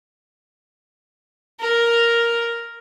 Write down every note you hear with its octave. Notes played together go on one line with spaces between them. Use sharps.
A#4